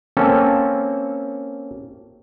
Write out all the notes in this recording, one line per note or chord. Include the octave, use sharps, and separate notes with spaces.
A#3 C4 C#4 A4